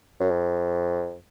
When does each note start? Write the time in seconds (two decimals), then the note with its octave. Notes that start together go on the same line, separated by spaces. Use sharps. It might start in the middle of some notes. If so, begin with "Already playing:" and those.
0.20 F#2
0.31 F2